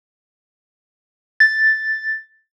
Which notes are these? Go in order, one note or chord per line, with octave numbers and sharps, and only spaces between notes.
A6